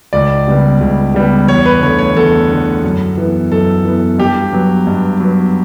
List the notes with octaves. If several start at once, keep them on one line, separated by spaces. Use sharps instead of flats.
C#2 D5
C#3 G3 B3
C#2
C#3 G3 B3
E2 C#5
B4
D3 A3 C#5
C#5
E2 A4
D3 A3
F#2
E3 B3
F#2 A4
E3 B3
G2 G4
F#3 B3
G2
F#3 B3